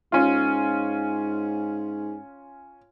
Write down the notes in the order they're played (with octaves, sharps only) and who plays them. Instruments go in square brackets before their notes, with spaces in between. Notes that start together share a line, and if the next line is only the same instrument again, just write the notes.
[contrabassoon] G#2 [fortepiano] C#4 F4